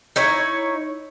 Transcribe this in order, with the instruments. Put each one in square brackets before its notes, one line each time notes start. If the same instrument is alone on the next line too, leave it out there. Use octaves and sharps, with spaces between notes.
[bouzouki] D#4 E4 C#5